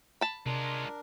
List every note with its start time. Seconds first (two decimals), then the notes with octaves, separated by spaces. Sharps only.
0.21 A5 B5
0.46 C3 G#3 D4 F4 A#4